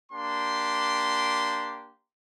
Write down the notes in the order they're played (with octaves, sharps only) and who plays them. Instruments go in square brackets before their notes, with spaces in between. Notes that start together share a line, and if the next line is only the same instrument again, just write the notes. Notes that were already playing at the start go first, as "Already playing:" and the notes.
[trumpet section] A#3 D4 G4 C6